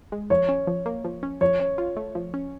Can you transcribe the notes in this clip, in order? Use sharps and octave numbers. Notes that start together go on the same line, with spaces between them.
G#3
F3 C#5
C#4
F3
A#3
F3
C#4
F3 C#5
C#4
F4
A3
F3
C#4